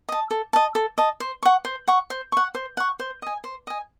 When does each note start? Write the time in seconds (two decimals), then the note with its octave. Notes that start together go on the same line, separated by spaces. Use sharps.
0.09 D#5 A5
0.31 A4
0.53 D#5 A5
0.75 A4
0.98 D#5 A5
1.20 C5
1.43 F#5 C#6
1.65 C5
1.88 F#5 C#6
2.10 C5
2.32 F#5 C#6
2.55 C5
2.77 F#5 C#6
3.00 C5
3.22 D#5 G#5
3.44 C5
3.67 D#5 G#5